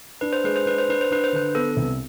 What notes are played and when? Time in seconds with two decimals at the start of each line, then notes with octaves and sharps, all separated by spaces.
0.21 D4 B4
0.33 C5
0.44 G#3 B4
0.56 C5
0.66 D4 B4
0.78 C5
0.89 D4 B4
1.01 C5
1.11 D4 B4
1.24 C5
1.33 D3 B4
1.55 B3 A4
1.77 C2